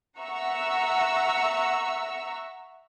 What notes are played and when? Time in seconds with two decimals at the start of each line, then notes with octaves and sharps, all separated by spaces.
0.20 E5 F#5 A#5 C#6 E6